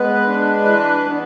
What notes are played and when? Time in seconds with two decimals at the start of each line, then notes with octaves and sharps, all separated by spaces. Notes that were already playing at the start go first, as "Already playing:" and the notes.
Already playing: G#3 B3 B4
0.27 D4
0.64 E3
1.00 B3